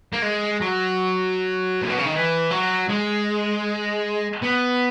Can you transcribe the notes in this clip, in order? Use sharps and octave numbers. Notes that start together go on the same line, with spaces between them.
A#3
G#3
F#3
A#2
B2
C#3
D#3
E3
F#3
G#3
B3